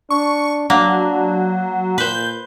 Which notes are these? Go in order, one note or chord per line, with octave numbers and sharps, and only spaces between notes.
D4 C#6
F#3 A#3 D4
A#2 B4 C5 G6